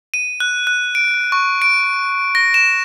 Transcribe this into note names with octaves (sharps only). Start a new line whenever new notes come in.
D#7
F#6
F#6
D7
C#6
D7
A#6
E7